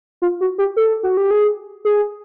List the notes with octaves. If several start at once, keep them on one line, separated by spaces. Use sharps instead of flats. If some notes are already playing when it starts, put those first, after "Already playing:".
F4
F#4
G4
A4
F#4
G4
G#4
G#4